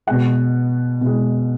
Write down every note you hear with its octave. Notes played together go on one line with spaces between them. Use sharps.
B2 G#3 F#5
B2 G#3